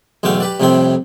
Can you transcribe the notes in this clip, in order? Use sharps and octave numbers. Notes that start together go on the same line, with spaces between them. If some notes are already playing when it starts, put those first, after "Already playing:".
B1 E2 D3 A3 F5 G5
G4 B4 D5
C2 F2 A2 C3 C4 G5